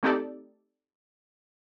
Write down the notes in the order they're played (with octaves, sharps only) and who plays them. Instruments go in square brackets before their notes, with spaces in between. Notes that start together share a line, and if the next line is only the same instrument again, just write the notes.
[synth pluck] A3 C4 D#4 G4 A4 D5